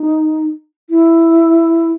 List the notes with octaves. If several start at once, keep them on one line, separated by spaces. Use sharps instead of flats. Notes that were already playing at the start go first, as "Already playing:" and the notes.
Already playing: D#4
E4